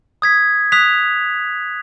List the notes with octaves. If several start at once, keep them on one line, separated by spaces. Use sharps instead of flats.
D#6 G#6 B6
D#6 F#6 B6 F7